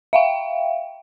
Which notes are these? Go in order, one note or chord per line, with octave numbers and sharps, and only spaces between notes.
E5 F5 G5